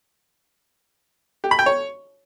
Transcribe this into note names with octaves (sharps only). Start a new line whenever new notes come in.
G4
B5
G5
C#5